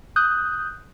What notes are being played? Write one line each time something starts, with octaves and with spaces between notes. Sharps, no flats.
D#6 F#6 G6